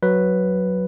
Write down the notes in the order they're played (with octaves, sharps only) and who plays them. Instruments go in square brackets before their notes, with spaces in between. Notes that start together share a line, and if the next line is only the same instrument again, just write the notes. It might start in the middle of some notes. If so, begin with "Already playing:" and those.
[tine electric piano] F#3 B4